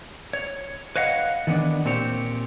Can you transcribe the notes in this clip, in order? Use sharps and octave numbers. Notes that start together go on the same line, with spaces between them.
C#5
B4 C#5 D#5 F5 F#5
D#3 E3 B3 D4
A#2 C4 G4 C#5